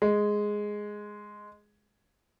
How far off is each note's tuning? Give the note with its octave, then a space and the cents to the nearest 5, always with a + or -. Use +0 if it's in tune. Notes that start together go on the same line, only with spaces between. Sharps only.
G#3 +0